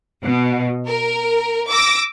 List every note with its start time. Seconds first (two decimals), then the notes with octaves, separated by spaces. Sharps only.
0.22 B2
0.87 A#4
1.70 D6 E6 A#6